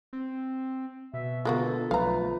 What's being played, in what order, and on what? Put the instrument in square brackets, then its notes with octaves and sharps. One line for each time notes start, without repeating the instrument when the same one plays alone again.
[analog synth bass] C4
[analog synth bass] B2 [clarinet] E5
[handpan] D3 B3 F4 [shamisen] G#3 A#3 F#4 [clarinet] A4
[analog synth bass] B1 [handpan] F3 B4 [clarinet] A3 [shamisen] F5 A#5